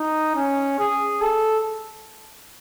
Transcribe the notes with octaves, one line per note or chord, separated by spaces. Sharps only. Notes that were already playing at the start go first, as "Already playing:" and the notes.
Already playing: D#4
C#4
G#4
A4